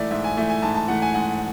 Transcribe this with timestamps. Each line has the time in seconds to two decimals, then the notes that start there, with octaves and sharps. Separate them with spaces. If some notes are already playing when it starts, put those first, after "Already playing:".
Already playing: G#2 E3 A3 D5 E5
0.11 G#2 E5
0.24 G#5
0.37 E3 A3 E5
0.50 G#5
0.62 G#2 A5
0.75 A5
0.88 E3 A3 F#5
1.02 G#5
1.14 G#2 F#5